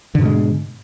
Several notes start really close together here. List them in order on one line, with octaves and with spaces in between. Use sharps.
D3 G#2 B2 G#3